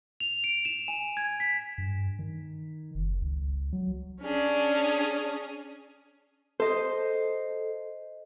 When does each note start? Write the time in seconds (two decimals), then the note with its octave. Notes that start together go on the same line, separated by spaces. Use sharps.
0.20 F7
0.44 D7
0.65 E7
0.88 G#5
1.17 G#6
1.40 B6
1.78 G2
2.19 D#3
2.95 F#1
3.22 C#2
3.73 F#3
4.22 C#4 D4 G#4
6.60 A4 C5 D#5